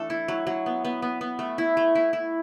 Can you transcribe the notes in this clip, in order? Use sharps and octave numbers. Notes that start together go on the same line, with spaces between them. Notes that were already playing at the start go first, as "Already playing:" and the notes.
Already playing: E3 A3 D4 A4
E4
F#3
F#3
B3
B3
B3
B3
A3
E4
A3
E4
E4